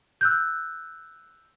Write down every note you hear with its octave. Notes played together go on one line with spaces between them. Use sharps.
E6 F#6 G6